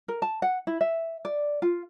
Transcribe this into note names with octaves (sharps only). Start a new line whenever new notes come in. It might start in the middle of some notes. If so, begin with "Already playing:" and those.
A#4
A5
F#5
E4
E5
D5
F4